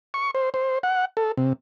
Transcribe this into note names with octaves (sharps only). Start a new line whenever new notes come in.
C#6
C5
C5
F#5
A4
C3